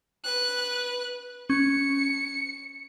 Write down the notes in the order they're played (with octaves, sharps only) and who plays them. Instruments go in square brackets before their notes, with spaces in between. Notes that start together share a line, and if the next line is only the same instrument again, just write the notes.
[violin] B4 F#6
[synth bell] C#4 [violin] C#7